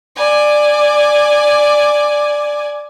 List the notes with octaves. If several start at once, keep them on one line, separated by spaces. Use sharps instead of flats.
D5 G#5